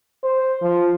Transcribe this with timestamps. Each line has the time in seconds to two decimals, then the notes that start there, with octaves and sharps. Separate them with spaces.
0.24 C5
0.62 F3